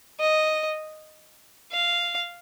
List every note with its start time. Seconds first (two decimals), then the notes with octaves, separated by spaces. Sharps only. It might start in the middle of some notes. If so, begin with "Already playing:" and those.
0.20 D#5
1.72 F5